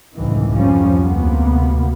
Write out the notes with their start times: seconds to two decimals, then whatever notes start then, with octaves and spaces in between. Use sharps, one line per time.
0.16 C#2 F#2 A2 C3 D#3 E3
0.54 C2 F2 G#2 F3 G3 C#4
1.03 D2 C3 A#3 B3